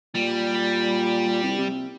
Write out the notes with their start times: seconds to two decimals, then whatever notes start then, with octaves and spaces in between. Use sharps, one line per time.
0.15 A#2 G3
1.43 C2
1.58 C3